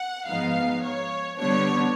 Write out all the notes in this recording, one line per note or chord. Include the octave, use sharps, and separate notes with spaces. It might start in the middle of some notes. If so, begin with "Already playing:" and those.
Already playing: F#5
G#2 F3 G#3 B3 D#4 F5
C#5
D3 G3 B3 D4 C#5